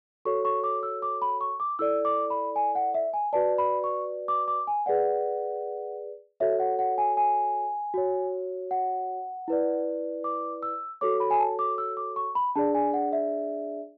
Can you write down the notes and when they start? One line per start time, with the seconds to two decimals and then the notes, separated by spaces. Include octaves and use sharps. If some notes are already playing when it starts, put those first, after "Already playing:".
0.25 F#4 A4 C#5 C#6
0.45 C#6
0.64 D6
0.83 E6
1.02 D6
1.22 B5
1.41 C#6
1.60 D6
1.79 E4 A4 D5 E6
2.05 D6
2.30 B5
2.56 G#5
2.75 F#5
2.94 E5
3.14 G#5
3.33 F#4 B4 D5 A5
3.58 B5
3.84 C#6
4.28 D6
4.48 D6
4.67 G#5
4.86 G#4 B4 D5 F#5
6.40 F#4 A4 C#5 E5
6.60 F#5
6.79 F#5
6.98 G#5
7.17 G#5
7.94 F#4 C#5
8.71 F#5
9.48 E4 B4 D5
10.24 D6
10.63 E6
11.01 F#4 A4 C#5 D6
11.20 B5
11.30 G#5
11.40 A5
11.59 D6
11.78 E6
11.97 D6
12.16 C#6
12.35 B5
12.55 D4 G#4 D5 A5
12.74 G#5
12.94 F#5
13.12 E5